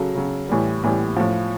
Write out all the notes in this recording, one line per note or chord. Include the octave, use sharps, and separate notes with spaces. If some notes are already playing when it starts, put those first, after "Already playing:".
Already playing: C#3 F#3 A4
C#3 F#3
A2 E3 G3
A2 E3 G3
A2 F3